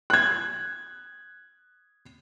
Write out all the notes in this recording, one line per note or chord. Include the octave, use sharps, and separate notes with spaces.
F#6 G#6